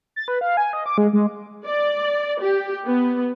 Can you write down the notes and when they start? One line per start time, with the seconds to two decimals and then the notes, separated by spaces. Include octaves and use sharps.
0.16 A6
0.28 B4
0.41 F5
0.57 G#5
0.73 D#5
0.86 D6
0.98 G#3
1.13 G#3
1.65 D5
2.41 G4
2.86 B3